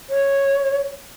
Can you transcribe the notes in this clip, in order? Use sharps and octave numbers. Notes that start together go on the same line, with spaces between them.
C#5